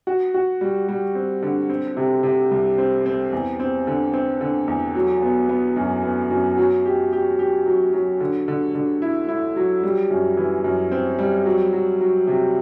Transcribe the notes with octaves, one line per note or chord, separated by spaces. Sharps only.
F#4
F#4
G3
G3
C4
D3
C4
C3
C3
C2
C4
C4
E2
C4
D3
C4
D3
E2
F#3
B3
B3
F#2
B3
F#2
F#3
G4
G4
G4
F#3
F#3
D3
D3
D3
E4
E4
F#3
G3
F#2
E3
F#2
C4
G3
F#3
F#3
F#3
C3